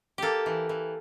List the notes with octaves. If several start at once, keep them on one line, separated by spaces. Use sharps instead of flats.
A#3 G4 A4
E3
E3